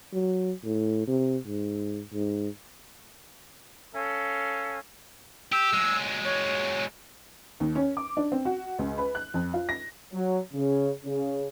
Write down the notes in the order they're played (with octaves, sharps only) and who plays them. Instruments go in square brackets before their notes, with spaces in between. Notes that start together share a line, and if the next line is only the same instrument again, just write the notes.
[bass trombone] F#3
A2
C3
G#2
G#2
[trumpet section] C#4 A4 F5
[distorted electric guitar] G4 [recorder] E6
[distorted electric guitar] F#3 G#3
[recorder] C#5
[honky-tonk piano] D#2
C#4
D6
D4
C4
F#4
C#2
B4
F#6
F2
F4
A#6
[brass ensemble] F#3
C#3
C#3